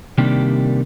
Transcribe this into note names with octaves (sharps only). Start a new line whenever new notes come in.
C3 D#3 G3 A#3 D4 G4